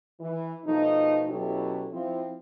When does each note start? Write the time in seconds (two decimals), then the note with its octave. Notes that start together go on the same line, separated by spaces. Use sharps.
0.21 E3
0.65 B2 F3 A3 D#4
1.28 B2 F#3 C#4 E4 G4 A4
1.92 F3 C4 E4